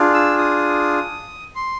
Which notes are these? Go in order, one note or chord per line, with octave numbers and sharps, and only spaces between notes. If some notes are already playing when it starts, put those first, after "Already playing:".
Already playing: D4 F4 G#4
E6
D#6
C6